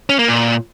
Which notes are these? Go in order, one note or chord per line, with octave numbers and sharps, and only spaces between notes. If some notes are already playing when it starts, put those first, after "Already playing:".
C#4
A#3
A#2